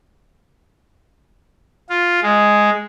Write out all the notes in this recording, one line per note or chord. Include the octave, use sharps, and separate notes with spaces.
F4
G#3